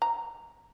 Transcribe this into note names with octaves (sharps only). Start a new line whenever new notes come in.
A#5